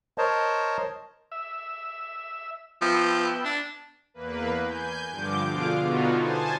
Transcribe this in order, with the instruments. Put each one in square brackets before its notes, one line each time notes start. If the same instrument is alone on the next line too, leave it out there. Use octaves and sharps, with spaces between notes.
[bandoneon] A#4 C5 C#5 D#5 A5
[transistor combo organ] E5
[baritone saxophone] F3 [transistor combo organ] B3 E5 G5
[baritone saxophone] D4
[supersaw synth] E2 A#3 B4
G#5 G6
G2 D3 F3 D6 G6
B2 D3 F4 G#4 F5 D6
B2 D3 B3 D#4 F4 F#4
C5 G#5 A5